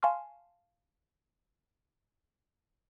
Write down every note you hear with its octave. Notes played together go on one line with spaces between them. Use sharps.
F5 G#5 A5 C6 C#6 F6